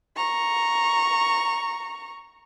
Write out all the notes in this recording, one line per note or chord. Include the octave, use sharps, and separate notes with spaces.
A#5 C#6